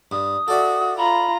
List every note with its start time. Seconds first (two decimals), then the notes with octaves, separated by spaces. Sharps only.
0.11 G2 D#6
0.48 F#4 A4 D5 E5
0.97 F4 A#5 B5